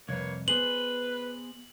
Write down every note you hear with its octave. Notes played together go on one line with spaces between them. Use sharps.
C2 F2 A#3 B4 C#5
B3 G#4 B4 C5 F#7